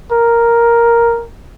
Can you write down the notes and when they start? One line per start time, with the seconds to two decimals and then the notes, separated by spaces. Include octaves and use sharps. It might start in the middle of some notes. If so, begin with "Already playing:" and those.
0.12 A#4